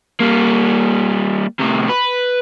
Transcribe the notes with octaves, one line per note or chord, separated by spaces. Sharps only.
G3 A#3
A2 C3
B4